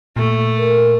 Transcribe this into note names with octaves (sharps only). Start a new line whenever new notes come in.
A#2 A3
A#4